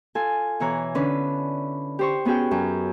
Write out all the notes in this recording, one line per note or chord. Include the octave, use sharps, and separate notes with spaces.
F4 A4 G#5
B2 E3 E4 C#5 A#5 F#6
D3 C#4 D4 B4
G4 C5 C#6
B3 C#4 F#4 G#4 G5
F#2